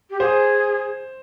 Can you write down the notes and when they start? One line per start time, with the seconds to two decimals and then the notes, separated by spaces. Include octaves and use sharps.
0.10 G4
0.20 G#4 C5